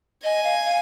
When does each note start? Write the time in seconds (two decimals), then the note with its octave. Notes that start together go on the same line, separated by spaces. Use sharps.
0.24 D#5 G#5
0.44 F5
0.65 F5